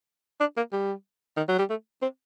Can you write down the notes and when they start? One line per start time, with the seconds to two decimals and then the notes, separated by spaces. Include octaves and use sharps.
0.40 D4
0.57 A#3
0.72 G3
1.37 D#3
1.48 F#3
1.59 G3
1.70 A3
2.02 C4